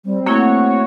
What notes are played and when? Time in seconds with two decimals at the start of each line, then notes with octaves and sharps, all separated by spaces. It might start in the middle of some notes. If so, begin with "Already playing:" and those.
0.05 G3 C4
0.26 A3 A#3 E4 F#4 C#5